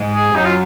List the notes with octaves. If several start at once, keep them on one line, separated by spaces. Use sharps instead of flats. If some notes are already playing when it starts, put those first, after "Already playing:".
Already playing: G#2 G#3
G#4
F#2 F#3 D#4
F4